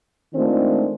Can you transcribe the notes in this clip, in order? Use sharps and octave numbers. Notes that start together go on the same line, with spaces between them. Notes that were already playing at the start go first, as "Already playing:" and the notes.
D#3 G#3 A3 C4 D4 F4